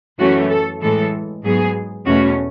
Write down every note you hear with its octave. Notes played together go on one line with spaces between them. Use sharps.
F#2 E3 A3 C#4 F#4
A4
A2 E3 G#3 A4
G#2 F#3 B3 G#4
E2 B2 A3 C#4 F#4